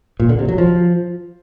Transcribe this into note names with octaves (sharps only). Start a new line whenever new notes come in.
A#2
D3
C3
F#3
F3